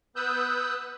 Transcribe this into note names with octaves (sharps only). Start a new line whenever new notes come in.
B3 B4 D#6 E6 F#6 G6